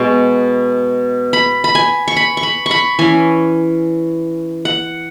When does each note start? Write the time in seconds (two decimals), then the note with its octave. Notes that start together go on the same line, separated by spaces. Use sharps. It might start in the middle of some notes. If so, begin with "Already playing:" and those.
Already playing: B2 G#3 B3 C#6
1.33 B5
1.64 B5
1.75 G#5
2.08 C#6
2.17 B5
2.37 C#6
2.43 B5
2.66 B5 C#6
2.99 E3 C#4 G#5
4.65 F#5